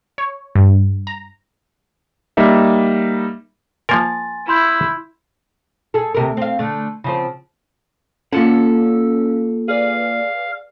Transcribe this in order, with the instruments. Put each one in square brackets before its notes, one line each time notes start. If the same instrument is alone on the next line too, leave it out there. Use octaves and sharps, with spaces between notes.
[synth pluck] C#5
G2
A#5
[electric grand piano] G3 A#3 D#4 E5
[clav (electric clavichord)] F3 A#3 A#4 [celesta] G#5 C6 A6
[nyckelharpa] E4 [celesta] B5 C6 G6
[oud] G#4 A4
D2 C3 A#4
C4 F5
D3 A3
C#3 F3 C4
[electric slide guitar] A#3 F4 F#5 [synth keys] C#4 F5 [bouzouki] A4
[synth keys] G#4 B4 D5 [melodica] F5